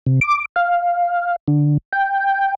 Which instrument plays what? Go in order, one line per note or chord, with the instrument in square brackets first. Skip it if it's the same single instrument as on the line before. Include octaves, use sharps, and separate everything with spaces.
[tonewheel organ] C3
D6
F5
D3
G5